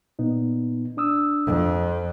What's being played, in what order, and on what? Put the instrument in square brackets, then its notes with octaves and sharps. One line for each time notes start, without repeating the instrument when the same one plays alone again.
[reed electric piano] A#2 B3 D#4
D4 D#6 E6
[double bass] F2